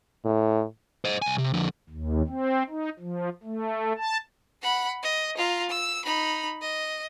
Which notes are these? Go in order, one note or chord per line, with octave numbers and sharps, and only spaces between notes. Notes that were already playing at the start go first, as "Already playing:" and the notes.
A2
C5 D#5
C2 G#5
C3
F2 D3
D#2
C4
D#4
F3
A3
A5
F#5 B5
D#5
F4 A#5
E6
D#4 B5
D#5